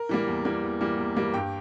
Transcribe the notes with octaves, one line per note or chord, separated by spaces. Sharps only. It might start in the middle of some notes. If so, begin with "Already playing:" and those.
Already playing: A#4
E3 G3 A#3
E2
E3 G3 A#3
E2
E3 G3 A#3
E2
E3 G3 A#3
G2 G5